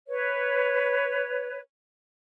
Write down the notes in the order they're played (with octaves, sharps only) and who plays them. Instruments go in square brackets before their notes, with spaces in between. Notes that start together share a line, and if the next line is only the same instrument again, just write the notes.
[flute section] B4 C#5